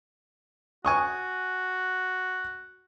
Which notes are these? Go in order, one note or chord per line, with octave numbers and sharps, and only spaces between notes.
F#4 G#5 C#6 D#6